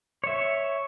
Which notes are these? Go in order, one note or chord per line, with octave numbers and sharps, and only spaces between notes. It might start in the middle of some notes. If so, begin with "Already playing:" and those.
C#5 E5